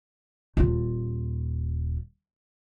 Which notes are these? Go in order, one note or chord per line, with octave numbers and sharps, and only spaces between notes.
D#1 F4